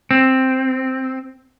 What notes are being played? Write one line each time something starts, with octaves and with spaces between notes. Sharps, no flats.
C4